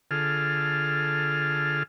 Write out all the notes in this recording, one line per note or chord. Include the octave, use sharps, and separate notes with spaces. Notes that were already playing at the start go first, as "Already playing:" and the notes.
D3 F4 G#4 A4 F6